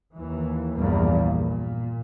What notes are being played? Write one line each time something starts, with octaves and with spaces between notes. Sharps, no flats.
D#2 E3
A#1 E2 G2 A#3
A#2